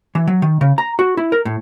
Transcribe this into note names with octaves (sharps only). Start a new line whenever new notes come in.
E3
F#3
D#3
C#3
A#5
F#4
E4
A#4
A2